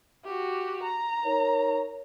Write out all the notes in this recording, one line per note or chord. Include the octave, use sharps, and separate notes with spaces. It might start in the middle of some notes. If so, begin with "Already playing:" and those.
F#4 G4
A#5
D#4 A#4 C#5